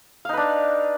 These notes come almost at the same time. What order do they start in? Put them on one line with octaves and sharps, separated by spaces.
F5 D#4 B4 D4